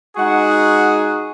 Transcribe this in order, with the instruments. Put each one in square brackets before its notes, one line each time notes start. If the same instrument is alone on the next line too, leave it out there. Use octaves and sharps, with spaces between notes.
[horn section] G#3 D#4 F#4 G#4 F#5